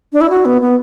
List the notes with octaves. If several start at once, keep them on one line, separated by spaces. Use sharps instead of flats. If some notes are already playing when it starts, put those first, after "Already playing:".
D4
E4
F#4
B3
B3